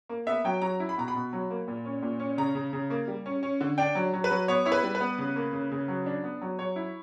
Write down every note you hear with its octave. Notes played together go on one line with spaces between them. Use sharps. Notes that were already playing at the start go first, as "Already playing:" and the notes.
A#3
B3 E5
F#3 G5
F#3 A#5
E4
B5
B2 A#5
B5
B2
F#3
A#3
A#2
C#4
A#2
C#4
C#3 A#5
C#3
C#3
A#3
G3
C#4
C#4
D3
D4 G5
F#3
F#3
B4
F#3
B3 C#5
E4 C#5
B4
G3
B4
B3
C#3
A#3
C#3
C#3
F#3
D4
B3
F#3
F#3 C#5
E4